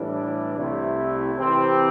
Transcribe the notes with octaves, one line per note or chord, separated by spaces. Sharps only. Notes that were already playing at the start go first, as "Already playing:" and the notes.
Already playing: A2 E3 G3 D4
C2 C3 A3 E4
C3 E3 C4 G4